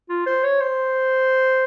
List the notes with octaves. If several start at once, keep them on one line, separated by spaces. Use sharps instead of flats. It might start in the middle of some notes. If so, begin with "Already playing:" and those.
F4
C5
C#5
C5